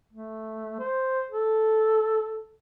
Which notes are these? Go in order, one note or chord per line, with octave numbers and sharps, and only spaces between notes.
A3
C5
A4